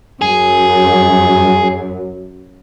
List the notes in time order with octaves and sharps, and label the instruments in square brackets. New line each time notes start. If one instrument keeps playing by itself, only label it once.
[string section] F#2 [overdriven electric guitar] G#4